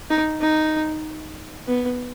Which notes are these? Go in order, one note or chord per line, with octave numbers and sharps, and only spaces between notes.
D#4
D#4
B3